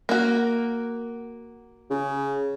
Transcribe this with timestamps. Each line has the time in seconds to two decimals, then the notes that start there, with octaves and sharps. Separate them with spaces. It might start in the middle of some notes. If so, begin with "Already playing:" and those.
0.09 A#3 F#4
1.91 C#3